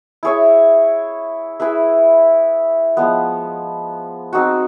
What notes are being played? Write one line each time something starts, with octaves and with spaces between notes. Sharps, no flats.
E4 G#4 C#5 E5
E4 G#4 B4 E5
F3 G#3 B3
C4 D#4 F#4